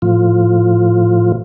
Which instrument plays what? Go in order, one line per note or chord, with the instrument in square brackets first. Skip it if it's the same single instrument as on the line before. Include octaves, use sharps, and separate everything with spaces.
[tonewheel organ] A2 F3 F4